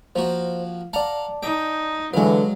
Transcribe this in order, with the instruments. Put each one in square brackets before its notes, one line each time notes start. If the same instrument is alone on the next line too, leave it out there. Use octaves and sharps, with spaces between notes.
[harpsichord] F3 A#3 F#4 [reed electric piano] C5
[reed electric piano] D5 A5 [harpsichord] F5 F#5 A#5
[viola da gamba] D#4 [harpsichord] G5
[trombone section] D3 E3 [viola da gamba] F#3 [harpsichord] G#3 F5 [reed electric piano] B4